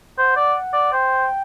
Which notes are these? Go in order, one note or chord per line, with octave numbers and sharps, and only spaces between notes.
C5 F#5
D5
D5
C5 G5